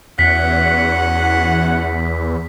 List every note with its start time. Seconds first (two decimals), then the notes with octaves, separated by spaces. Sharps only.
0.19 E2 C#4 F#4 F#5 B6